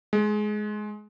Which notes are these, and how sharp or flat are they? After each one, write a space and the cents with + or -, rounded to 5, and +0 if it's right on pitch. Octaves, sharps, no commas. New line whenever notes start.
G#3 +20